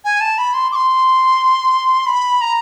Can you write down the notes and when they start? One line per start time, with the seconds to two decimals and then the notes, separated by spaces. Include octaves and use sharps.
0.05 G#5
0.21 A5
0.38 B5
0.54 C6
0.72 D6
0.75 C6
2.06 B5
2.41 A#5